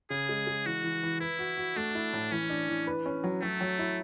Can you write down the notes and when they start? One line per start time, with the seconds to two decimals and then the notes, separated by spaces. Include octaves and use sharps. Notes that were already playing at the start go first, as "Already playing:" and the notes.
0.10 C#3 G#4
0.29 G#3
0.47 G#3
0.65 E3 F#4
0.84 E3
1.03 E3
1.20 E4 B4
1.39 F#4
1.57 F#4
1.76 A3 D4
1.95 E4
2.13 A2
2.31 E3 C#4
2.50 D4
2.68 E3
2.87 B4
3.06 C#4
3.24 F#3
3.41 F#3 A3
3.61 F#3
3.79 E4